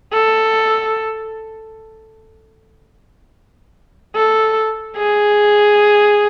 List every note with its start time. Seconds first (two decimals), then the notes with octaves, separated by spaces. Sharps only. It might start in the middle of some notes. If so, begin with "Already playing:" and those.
0.13 A4
4.16 A4
4.97 G#4